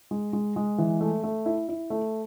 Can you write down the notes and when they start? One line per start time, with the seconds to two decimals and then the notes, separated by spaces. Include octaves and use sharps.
0.11 G#3
0.33 G#3
0.56 G#3
0.78 E3
1.01 A3
1.23 A3
1.46 E4
1.68 E4
1.90 A3